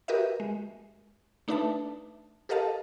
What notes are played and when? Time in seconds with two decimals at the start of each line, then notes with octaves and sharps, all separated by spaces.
0.08 F#4 G4 A#4 B4 D#5 E5
0.40 G#3
1.48 A3 D4 D#4 B4 E5 A5
2.49 G4 A4 A#4 D#5 F5 A5